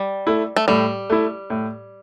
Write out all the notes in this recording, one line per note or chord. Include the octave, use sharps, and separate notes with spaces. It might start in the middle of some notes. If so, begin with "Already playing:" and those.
Already playing: G3
A3 E4
A3
A2 G3
A3 E4
A2